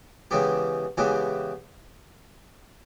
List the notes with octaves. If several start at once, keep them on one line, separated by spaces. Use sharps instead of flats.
C#3 E3 G#3 B3 G4
C#3 E3 G#3 B3 G4